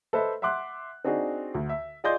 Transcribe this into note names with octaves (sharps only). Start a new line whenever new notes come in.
A4 B4 C5 D#5 E5
E5 F#5 C6 D6 F#6
C4 D4 D#4 F#4 G#4
D2
E5
F4 G#4 D5 D#5 C6 G6